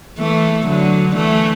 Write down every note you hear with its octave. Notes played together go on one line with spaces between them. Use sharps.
E3 A3
D3 F#3
E3 A3